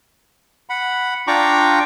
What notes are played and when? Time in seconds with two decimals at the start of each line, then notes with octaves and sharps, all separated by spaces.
0.70 F#5 B5
1.27 D4 F4 G5 A#5 C#6 D6